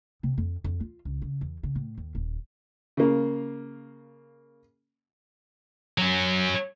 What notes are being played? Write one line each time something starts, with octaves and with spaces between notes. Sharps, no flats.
C3
F2
F2
F4
C#2
C#3
E2
C#3
A2
D#2
D#1
C#3 A#3
F#3 C#4